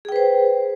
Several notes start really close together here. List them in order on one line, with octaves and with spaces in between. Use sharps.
G#4 G5 B4 C5